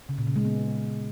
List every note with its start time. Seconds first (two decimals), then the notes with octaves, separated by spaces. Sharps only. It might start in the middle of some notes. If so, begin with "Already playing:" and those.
0.09 C#3
0.18 A#2
0.27 C#3
0.36 G#3
0.45 B3